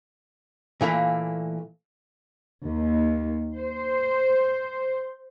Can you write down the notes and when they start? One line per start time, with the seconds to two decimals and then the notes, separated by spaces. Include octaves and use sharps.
0.81 A#2 E3 A3 A#3
2.68 D#2
3.56 C5